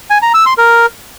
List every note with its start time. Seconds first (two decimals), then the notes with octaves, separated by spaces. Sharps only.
0.10 G#5
0.22 A#5
0.34 E6
0.46 C6
0.58 A#4